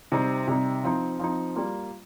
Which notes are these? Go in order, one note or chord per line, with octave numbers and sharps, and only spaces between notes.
C3 G3 C4 D#4
C3 G3 C4 D#4
F3 C4 D#4
F3 C4 D#4
G3 A#3 F4